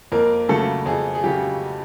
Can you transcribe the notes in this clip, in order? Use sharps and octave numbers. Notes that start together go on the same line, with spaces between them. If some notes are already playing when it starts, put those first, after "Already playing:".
F2 A#3 A#4
C#3 F#3 A3 A4
F2 G#4
G#4
C#3 F#3 G4